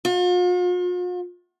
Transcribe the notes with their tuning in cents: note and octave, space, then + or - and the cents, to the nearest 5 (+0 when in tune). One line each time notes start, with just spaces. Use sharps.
F4 +45